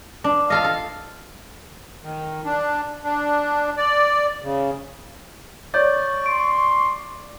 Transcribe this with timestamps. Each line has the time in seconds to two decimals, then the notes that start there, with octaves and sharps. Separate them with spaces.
0.24 D4
0.50 F4 A4 D#5 F5
0.64 A4
2.03 D#3
2.45 D4
3.04 D4
3.77 D5
4.43 C#3
5.74 C#5 D5 C#6 G6 A6
6.26 C6 D7